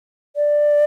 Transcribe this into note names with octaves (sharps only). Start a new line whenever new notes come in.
D5